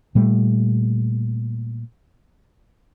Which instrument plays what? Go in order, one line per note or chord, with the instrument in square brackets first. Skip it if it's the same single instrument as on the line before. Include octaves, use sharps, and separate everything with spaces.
[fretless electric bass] A#2 G3 A3